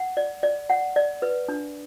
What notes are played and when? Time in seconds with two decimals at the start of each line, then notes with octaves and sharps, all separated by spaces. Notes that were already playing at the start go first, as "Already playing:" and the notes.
Already playing: F#5
0.17 D5
0.43 D5
0.70 F#5
0.96 D5
1.22 B4
1.48 D4